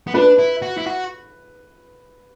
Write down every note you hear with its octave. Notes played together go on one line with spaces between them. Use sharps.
B3
D4 B4
E4
F#4
E4
F#4